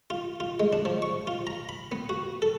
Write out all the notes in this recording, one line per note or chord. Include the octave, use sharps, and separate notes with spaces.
F4
F4
G#3
D4
F3
C#6
F4
A#5
B5
B3
F#4
A4